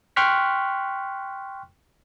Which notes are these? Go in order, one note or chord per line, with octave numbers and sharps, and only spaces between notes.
G5 C6 C#6 F6 F#6 B6